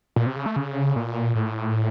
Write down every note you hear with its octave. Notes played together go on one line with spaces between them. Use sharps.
A#2
C3
C#3
A3
C#3
A#2
A2